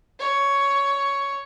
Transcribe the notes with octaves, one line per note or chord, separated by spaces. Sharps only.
C#5